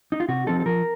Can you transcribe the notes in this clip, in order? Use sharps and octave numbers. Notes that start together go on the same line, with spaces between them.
D#4
F4
C3 F#4
F3 C4 D#4 A4
A4
F3 A#4